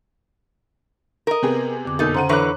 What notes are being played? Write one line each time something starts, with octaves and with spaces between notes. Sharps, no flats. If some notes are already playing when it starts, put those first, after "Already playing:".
A#4 D#5
C3 B3 G#4
F2 D3 D6
F#2 B2 A#3 D#4 A4
C#3 C5 F#5 A#5 C6 D#7
D3 E3 B4 C#5 A#5 C#6 D6 F#6